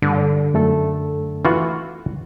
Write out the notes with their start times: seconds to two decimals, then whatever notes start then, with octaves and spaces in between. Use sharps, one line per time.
0.02 G2 D3
0.54 F#2 A3 A4
1.45 E3 F4 F#4